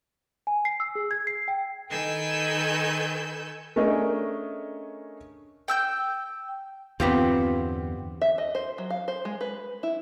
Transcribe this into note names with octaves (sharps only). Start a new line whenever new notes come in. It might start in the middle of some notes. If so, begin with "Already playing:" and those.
G#5
C7
E6
G#4
G#6
C7
G5
D#3 A4 B4 G#5 E6 G6
A3 C#4 D4 G#4 A#4 D#5
G5 E6 G6
E2 G2 D3 B3 C4 F4 G4
E5
D#5
C5
F#3
F5
C5
G#3
B4
E4